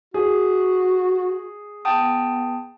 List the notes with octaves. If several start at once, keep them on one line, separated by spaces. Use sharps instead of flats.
F#4 G#4
B3 G5 A5 D#6